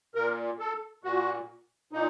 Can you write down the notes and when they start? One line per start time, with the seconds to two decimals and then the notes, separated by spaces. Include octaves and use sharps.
0.15 A#2 A#4
0.60 A4
1.03 A#2 F#4
1.92 A#2 D#4